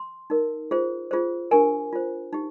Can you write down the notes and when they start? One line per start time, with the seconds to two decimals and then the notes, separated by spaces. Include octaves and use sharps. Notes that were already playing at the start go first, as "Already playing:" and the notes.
Already playing: C6
0.30 D#4 A#4
0.71 F4 G#4 C5
1.11 F4 G#4 C5
1.51 D4 G4 A#4 G#5
1.93 F4 C5
2.33 D#4 G4